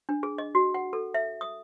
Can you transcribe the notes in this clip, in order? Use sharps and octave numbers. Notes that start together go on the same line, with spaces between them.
D4
G#4
D#5
F#4
F#5
A4
E5
D#6